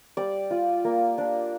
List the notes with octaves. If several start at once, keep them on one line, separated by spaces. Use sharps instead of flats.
G3 D5
F4
A#3
D4